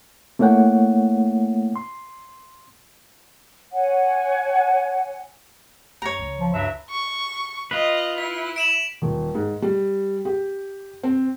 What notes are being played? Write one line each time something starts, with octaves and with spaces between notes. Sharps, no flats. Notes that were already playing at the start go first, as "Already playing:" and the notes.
A3 A#3 E4 C#5 F#5 G5
C6
C#5 F#5 G#5
F#2 C#5 A#5
C#2
F3
G2 F#3 E4 E5
C#6
F4 B4 D#5
E4 B6
D7 E7 F#7
D#1
G#2
G3
G4
C4